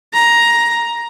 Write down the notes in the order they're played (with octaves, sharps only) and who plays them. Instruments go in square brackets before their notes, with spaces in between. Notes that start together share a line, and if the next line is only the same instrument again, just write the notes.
[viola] A#5